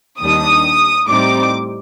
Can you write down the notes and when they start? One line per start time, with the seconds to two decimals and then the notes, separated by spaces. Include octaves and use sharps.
0.20 D#2 D#3 G3 D4 D#6
1.08 A2 G3 C4 D#4 D6